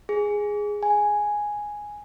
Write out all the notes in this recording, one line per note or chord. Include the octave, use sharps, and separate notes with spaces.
G#4
G#5